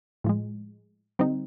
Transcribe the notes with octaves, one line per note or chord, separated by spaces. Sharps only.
A2 F3 G#3
D3 G3 C4 D#4